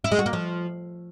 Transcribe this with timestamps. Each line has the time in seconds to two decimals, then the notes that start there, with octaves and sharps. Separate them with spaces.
0.04 E4
0.12 G#3
0.19 F#4
0.26 A#3
0.33 F3